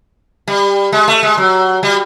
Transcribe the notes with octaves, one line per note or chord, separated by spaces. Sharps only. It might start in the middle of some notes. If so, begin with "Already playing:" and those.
G3
G#3
A3
G#3
F#3
G3